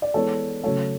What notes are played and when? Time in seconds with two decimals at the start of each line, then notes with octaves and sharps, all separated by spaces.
0.02 D5
0.14 E3 G#3 B3 A4 C#5
0.63 C#3 F#3 A3 A4 C#5